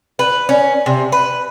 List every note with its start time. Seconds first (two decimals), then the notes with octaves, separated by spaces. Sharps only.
0.19 B4
0.49 C#4
0.86 C3
1.12 B4